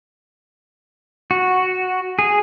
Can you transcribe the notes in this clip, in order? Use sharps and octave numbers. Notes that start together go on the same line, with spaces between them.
F#4
G#4